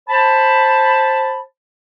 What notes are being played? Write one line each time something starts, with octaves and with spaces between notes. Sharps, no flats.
C5 A5 B5